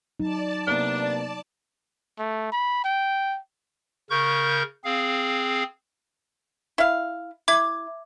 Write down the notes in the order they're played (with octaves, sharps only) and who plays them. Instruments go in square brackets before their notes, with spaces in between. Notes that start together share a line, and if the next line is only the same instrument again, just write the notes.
[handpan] F#3 D#4 [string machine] D5 A5
[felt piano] C3 A#3 B3 [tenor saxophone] D4
[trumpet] A3
B5
G5
[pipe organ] C#3 A#4 C#6 G6
C4 G#4 F5
[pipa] E4 F5
[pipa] E4 [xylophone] D6 G#6